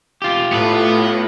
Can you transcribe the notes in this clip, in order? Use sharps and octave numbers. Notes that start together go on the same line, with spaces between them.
F4 G4
A2 A3 B3 B4